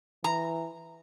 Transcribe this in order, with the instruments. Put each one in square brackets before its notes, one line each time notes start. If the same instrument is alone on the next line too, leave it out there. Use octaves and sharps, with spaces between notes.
[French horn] E3 [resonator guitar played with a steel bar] A#5